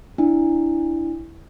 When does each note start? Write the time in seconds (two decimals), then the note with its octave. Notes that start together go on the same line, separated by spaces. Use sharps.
0.18 D4 E4